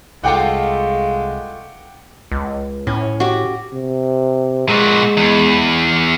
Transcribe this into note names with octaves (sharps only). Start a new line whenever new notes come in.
C2 G#3 A3 F4 A4 F#5 G5 D6
C#2
A2 C#4
F#4 G4
C3
A#2 G#3 F#4
E2